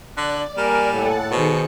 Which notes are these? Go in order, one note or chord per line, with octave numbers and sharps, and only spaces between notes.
D3 D5 F#6
G3 A#3 A#4 G#5
A2 A4 F#5 A5
B2 D#3 G#4 C5 C#7